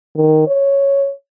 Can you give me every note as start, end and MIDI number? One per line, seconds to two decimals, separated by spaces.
0.15 0.45 51
0.47 1.11 73